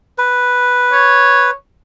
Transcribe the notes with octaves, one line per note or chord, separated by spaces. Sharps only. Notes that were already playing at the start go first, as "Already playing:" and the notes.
B4
C#5